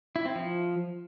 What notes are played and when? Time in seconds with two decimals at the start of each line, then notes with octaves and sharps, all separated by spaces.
0.16 E4
0.25 C4
0.35 F3